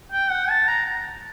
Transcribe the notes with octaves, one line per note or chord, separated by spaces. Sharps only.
G5
F#5
A5
A#5